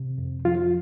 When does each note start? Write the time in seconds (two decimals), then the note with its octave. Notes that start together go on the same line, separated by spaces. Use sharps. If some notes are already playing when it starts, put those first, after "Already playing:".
Already playing: C3
0.18 F2
0.45 F3 F4